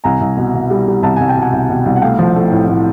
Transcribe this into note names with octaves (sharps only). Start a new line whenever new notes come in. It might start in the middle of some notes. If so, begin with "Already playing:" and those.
C2 G#5 A#5
C2
B2
B2
G3
G3
C2 A5
C2 G#5
G5
B2
F#5 G#5
C2
B2
C2
F#5
A3 F5 G5
F3
A3
A2
A2